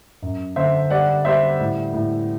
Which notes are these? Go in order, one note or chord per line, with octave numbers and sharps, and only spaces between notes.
F#2
D3 C5 E5
G3 D5 F#5
G3 C5 E5
A2
A2